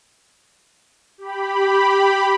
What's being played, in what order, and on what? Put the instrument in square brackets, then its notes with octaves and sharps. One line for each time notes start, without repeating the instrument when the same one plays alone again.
[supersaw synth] G4 B5